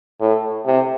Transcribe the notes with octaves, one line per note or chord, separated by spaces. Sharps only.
A2
C3